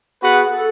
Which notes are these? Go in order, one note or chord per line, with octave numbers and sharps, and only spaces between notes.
B3 F#4 G#4 B4 F#5
A4